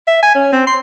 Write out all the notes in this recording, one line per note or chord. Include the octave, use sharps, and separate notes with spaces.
E5
G#5
C#4
C4
C6